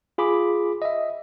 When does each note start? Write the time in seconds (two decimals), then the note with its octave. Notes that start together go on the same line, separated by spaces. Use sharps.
0.18 F4 G#4 B5 D6
0.82 D#5 E5